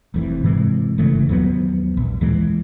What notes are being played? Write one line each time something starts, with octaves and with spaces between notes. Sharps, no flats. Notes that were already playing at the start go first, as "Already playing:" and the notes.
F1 F2 E3
G#2 C3 E3 G#3
G1 C#3 E3 A3
D#2 F3 F#3 B3
A#1
D#2 E3 G#3